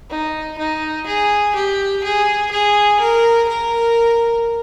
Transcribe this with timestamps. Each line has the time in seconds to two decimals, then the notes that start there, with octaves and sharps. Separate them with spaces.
0.10 D#4
0.59 D#4
1.06 G#4
1.56 G4
2.04 G#4
2.51 G#4
3.00 A#4
3.49 A#4